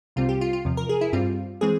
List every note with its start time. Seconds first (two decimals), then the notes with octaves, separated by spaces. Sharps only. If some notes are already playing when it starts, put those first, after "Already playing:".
0.16 C2 C3 G3 C4 F4
0.29 G4
0.41 F4
0.53 F4
0.65 E2 C3 F3
0.77 A#4
0.89 G#4
1.01 E4
1.12 G2 G3 C4 F4
1.61 E3 G#3 C4 G#4